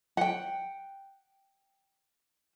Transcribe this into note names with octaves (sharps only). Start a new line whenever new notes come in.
F#5 G5